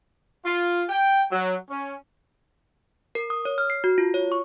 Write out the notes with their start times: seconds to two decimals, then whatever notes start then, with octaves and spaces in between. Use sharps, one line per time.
0.45 F4
0.89 G5
1.32 F#3
1.69 C#4
3.15 A#4
3.30 D#6
3.45 C#5
3.58 F6
3.70 C7
3.84 F#4
3.98 F4
4.14 C#5
4.32 C#6